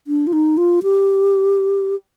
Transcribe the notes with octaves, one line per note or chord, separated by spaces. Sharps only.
D4
F4
D#4
F4
G4